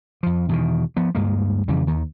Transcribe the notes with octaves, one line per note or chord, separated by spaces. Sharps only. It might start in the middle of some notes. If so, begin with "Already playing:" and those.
F2 F3
E2 B2 D#3
F3 B3
D2 G2 G#3 A#3
F2 C#3 E3 G3
D#2 D#3